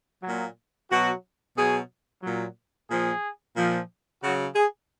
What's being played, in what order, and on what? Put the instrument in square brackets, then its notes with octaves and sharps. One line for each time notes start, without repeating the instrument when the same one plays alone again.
[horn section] F#3
A#2
B2 F#3 F#4
B2 F#3 G#4
A#2 F#3
A#2 F3 G#4
A#2 F3
C#3 F#3 F#4
G#4